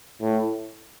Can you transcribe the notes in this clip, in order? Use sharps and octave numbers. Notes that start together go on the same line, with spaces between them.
A2